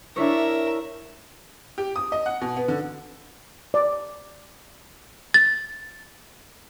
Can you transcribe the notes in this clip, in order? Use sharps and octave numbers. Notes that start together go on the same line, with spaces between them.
D4 E4 A#4 C#5 E5
G4
D#6
D#5
F#5
B2
B3
D3
D5
A6